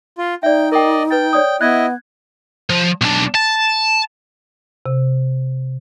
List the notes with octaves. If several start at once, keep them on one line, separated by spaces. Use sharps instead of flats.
F4
D#4 D5 E5 G5
A#4 D5 D#5 G5
B4 G5 A6
C#5 D5 D#6
B3 E4 D#5 F#6 G#6
F3
B1 D4
A5
C3